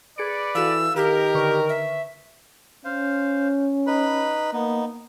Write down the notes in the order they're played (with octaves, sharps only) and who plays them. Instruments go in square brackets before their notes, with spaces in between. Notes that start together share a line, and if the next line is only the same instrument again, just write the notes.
[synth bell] G#4 C#7 D7 [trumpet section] B4 D5
[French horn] E3 [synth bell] F#4 A4 F5 [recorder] E6
[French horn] D#3 [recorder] G4 [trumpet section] A#4
[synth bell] D3 B4 C#6
[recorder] E5
[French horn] C#4 [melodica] C5 F5
[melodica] D#4 B4 B5
[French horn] A#3 [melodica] B3 D#4